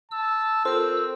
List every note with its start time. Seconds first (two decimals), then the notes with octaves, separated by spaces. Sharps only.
0.11 A5 E6
0.65 C4 F4 A4 A#4 C5